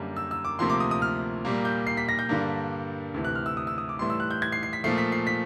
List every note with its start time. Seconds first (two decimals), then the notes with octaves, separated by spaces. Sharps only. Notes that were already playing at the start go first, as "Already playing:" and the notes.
Already playing: F#2 D3 G3 A#3
0.16 E6
0.31 E6
0.45 D6
0.59 D2 C3 F3 A#3 C6
0.69 D6
0.80 D#6
0.91 D#6
1.02 F6
1.45 A#2 G3 A#3
1.65 G6
1.87 C7
1.97 B6
2.09 A#6
2.19 G6
2.29 G2 D3 G3 A#3
3.14 D2 C3 E3
3.24 F#6
3.35 F6
3.46 E6
3.57 D#6
3.67 E6
3.78 D#6
3.89 D6
3.99 A2 E3 G3 C6
4.10 E6
4.20 F#6
4.31 G6
4.42 G#6
4.52 C7
4.63 C7
4.73 B6
4.84 A#2 F3 A3 C7
4.98 B6
5.12 C7
5.27 B6